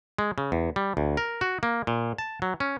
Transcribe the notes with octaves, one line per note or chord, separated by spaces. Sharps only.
G#3
C#3
E2
G3
D2
A#4
F#4
A#3
A#2
A5
F#3
C#4